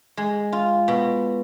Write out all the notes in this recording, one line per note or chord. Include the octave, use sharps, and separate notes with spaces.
G#3
F4
B2